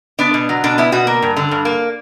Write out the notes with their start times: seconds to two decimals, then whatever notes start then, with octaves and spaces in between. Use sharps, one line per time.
0.19 B3 D4
0.34 B2
0.49 F#3
0.64 B2 D4
0.78 B3 E4
0.92 B2 F#4
1.07 A#3
1.22 G2
1.37 D3
1.51 G2
1.65 A#3